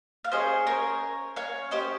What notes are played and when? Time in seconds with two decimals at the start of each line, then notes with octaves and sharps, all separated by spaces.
0.24 F5
0.32 C#4 G#4 C5 D#5
0.67 A#4 C#5
1.36 C#5 F5
1.71 C#4 G4 C5 D#5